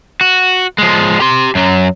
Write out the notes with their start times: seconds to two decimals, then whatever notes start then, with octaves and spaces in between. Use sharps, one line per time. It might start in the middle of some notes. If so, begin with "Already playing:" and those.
0.21 F#4
0.78 F3 G#3
1.21 G4 C6
1.55 F#2 F#3